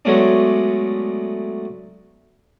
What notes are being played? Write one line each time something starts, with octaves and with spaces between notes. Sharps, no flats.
F#3 G#3 A3 B3 C#4 D4